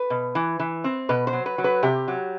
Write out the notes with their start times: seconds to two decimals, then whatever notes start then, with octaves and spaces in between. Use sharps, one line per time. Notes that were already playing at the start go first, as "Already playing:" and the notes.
Already playing: B4
0.10 B2
0.35 E3
0.59 E3
0.84 C4
1.09 B2 B4
1.27 C5
1.33 F#3
1.46 B4
1.58 F#3
1.64 B4
1.83 C3 G4
2.08 F#3